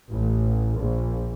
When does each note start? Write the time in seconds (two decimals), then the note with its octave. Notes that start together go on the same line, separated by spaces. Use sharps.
0.12 A1
0.79 A#1